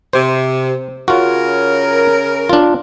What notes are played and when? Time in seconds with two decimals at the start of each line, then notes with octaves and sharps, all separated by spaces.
0.13 C3 C5
1.08 C#3 C#4 F4 F#4 A#4
2.49 D4 F4